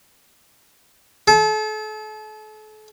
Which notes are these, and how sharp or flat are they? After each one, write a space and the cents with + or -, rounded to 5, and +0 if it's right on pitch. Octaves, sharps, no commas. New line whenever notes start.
A4 -40